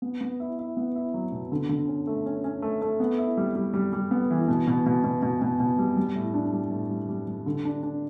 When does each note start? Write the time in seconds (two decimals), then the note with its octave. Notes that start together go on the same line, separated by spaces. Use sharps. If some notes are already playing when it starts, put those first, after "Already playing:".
0.02 B3
0.21 B3
0.40 E4
0.59 E4
0.77 B3
0.96 E4
1.14 F#3
1.32 B2
1.52 D3
1.69 D3
1.88 C#4
2.07 A3
2.26 C#4
2.44 C#4
2.62 A3
2.82 A3
3.00 B3
3.18 E4
3.37 G3
3.55 G3
3.74 G3
3.93 G3
4.11 B3
4.31 E3
4.48 B2
4.67 B2
4.86 B2
5.04 B2
5.22 B2
5.42 B2
5.60 B2
5.79 G3
5.97 G3
6.15 A2
6.34 D4
6.53 G3
6.71 A2
6.90 G3
7.09 G3
7.27 G3
7.46 D3
7.65 D4
7.83 D4